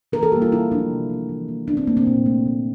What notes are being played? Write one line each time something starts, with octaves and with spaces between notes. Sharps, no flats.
E3 A#4
A4
G3 A#3 G4
F4
D3 E4
F3 A3 D4
C3
F3 A#3
E3
A#3
D3 D4
C4
A3 A#3
C4
A#2
A3
D3